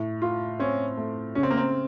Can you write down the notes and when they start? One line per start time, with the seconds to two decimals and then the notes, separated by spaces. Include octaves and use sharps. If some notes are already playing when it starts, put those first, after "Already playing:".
Already playing: A2
0.22 F4
0.59 C4 C#4
0.97 A3
1.35 C#3 C#4
1.43 C4
1.51 A#3
1.57 C4